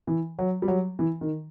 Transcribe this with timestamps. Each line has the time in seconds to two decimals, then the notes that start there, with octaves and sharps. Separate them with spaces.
0.07 E3
0.39 F#3
0.62 G3
0.68 F#3
0.99 E3
1.21 D#3